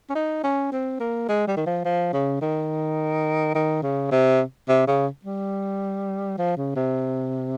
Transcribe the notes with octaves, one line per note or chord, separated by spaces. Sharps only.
C#4
D#4
C#4
C4
A#3
G#3
G3
D#3
F3
F3
C#3
D#3
D#3
C#3
C3
C3
C#3
G3
F3
C#3
C3